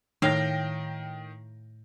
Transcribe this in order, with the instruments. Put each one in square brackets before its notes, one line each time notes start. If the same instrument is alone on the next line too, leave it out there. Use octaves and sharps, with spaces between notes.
[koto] A2 F5 [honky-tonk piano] D#3 G5 A#6